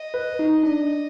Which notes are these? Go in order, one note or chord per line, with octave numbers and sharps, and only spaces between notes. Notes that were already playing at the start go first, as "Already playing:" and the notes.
Already playing: D#5
B4
D#4
D4 D#5